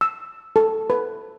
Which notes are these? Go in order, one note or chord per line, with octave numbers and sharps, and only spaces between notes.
E6
A4
B4